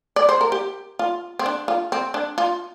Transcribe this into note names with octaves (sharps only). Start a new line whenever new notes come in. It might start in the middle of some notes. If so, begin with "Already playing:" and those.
D5
C5
A#4
G4
F4
C4
D4
F4
C4
D4
F4